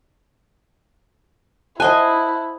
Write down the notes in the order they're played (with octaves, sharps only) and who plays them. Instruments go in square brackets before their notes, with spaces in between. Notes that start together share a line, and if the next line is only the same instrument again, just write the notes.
[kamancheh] E4 [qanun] C5 D#5 G#5 [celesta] F#5 A5 F#6